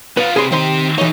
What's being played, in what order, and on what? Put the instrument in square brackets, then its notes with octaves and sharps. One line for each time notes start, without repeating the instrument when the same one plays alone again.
[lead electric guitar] B3 F4 [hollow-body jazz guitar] B4
[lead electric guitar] C3 B4 [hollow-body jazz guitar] G#4 C6
[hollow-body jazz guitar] D#3 C5 C6 [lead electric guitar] C4 G4
[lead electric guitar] B1 D#4 [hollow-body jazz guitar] E3 C#5